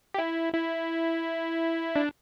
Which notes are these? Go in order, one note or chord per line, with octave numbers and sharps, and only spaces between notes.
G4
E4
E4
D4